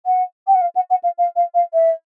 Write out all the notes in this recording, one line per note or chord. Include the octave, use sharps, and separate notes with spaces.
F#5
G5
F#5
F5
F#5
F#5
F5
F5
F5
F5
E5